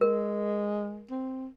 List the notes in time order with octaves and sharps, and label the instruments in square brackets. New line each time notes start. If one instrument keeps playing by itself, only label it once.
[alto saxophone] G#3 [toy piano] A#4
[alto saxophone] C4